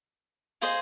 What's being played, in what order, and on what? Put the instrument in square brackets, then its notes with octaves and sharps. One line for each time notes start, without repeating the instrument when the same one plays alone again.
[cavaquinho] F4 G#4 C5 D#5